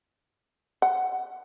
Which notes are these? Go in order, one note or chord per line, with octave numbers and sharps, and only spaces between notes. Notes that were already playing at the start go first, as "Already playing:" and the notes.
F#5